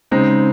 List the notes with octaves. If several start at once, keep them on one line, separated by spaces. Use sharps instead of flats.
C#3 G#3 C4 D#4